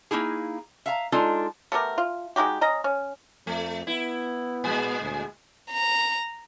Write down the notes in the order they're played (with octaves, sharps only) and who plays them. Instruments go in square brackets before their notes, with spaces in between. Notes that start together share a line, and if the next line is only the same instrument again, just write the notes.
[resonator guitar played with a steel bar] A#3 D#4 E4 G#4
E5 F5 A#5
G#3 D4 D#4 F4 A4
[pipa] A3 B3 G4 A#4
F4
G#3 D#4 F#4 G4
C#4 D#5 A#5
C#4
[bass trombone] F2 [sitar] A3
[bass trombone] B3 [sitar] E4
[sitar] A#2 G#3
[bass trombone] D2
[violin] A#5